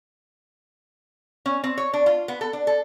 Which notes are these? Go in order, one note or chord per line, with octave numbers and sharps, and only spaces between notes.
C#4
C4
C#5
D4
F4
B3
A4
D4
A4